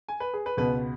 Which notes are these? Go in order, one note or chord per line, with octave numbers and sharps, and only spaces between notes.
G#5
B4
G#4
B4
C#2 B2 B3 B4